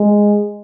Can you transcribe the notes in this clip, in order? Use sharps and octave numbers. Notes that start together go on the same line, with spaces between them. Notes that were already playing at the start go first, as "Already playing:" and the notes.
Already playing: G#3